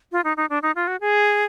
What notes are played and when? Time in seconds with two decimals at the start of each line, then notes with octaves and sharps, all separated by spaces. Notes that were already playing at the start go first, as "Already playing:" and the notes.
0.12 F4
0.24 D#4
0.37 D#4
0.50 D4
0.63 D#4
0.75 F4
0.87 F#4
1.01 G#4